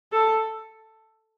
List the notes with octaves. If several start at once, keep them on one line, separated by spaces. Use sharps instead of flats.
A4